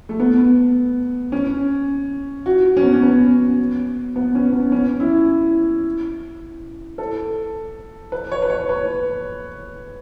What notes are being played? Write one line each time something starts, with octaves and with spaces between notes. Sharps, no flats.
A3
B3
C#4
F#4
C#4
B3
C#4
B3
B3
C#4
B3
C#4
E4
A4
B4
C#5
B4
C#5
B4